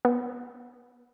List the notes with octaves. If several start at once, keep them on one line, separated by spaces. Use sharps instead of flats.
B3